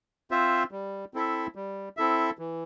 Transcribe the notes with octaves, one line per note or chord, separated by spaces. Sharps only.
C4 F4 C5 E5
G3
C4 E4 A4 E5
G3
C4 E4 A4 E5
E3